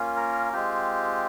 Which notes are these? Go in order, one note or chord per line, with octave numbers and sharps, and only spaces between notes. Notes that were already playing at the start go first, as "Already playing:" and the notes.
Already playing: A#3 C#4 F4
A#4
G#3 C4 F4 G4